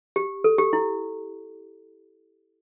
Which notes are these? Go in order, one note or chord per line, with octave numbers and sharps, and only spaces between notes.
G4
A4
G4
E4